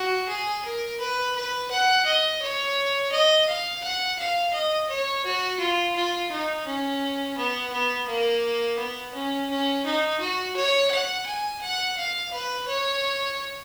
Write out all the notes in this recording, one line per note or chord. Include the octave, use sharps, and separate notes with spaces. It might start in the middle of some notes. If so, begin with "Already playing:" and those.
Already playing: F#4
G#4
A#4
B4
B4
F#5
D#5
C#5
D#5
F5
F#5
F5
D#5
C#5
F#4
F4
F4
D#4
C#4
B3
B3
A#3
B3
C#4
C#4
D#4
F#4
C#5
F#5
G#5
F#5
F5
B4
C#5